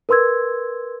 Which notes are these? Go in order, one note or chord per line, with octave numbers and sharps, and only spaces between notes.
A#4 B4 C6 E6 G#6